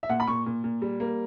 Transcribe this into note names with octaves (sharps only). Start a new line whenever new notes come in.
E5
A#2 F#5
B5
A#2 C#6
A#2
A#2
G3
A#3